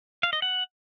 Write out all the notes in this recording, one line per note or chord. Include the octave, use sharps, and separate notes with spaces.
F5
D#5
F#5